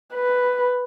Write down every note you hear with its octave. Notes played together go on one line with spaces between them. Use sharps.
B4